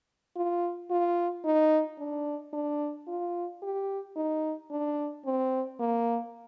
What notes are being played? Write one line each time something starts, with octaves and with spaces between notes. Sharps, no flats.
F4
F4
D#4
D4
D4
F4
G4
D#4
D4
C4
A#3